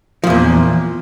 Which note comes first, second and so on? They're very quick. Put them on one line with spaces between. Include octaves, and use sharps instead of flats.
F3 E2 A#2